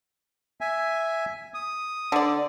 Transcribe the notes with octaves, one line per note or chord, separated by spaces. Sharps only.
E5 G#5
D#6
D3 D5